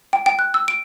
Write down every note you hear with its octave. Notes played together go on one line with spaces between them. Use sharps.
G5
G5
F#6
E6
D7